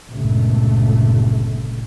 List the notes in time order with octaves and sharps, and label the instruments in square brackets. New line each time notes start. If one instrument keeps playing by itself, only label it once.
[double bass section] G1 C#2 A#2 A3